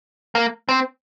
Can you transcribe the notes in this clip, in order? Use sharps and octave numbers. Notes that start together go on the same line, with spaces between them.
A#3
C4